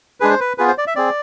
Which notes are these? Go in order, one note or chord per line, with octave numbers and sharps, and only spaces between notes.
G#3 D4 G#4 B4
C5
B4
B3 F4 G#4 B4
C5
D5
E5
C4 G#4 D5